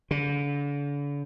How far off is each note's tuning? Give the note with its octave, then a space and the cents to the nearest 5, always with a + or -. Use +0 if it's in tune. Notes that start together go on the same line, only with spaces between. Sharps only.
D3 -40